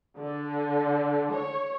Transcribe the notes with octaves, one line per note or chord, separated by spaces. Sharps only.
D3
C#5